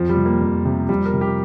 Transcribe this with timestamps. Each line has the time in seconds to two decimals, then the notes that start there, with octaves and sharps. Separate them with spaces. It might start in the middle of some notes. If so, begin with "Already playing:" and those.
Already playing: F2 F3
0.09 G3
0.17 C3
0.25 A#3
0.42 F2
0.65 C3
0.89 F2 G3
1.05 A#4
1.13 C3
1.21 G4